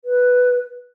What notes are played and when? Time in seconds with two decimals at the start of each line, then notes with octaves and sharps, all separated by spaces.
0.05 B4